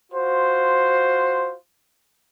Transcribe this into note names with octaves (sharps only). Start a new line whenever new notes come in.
F4 F#4 C5